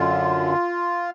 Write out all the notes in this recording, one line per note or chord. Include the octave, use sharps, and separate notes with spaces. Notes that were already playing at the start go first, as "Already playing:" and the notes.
Already playing: F#2 D3 F4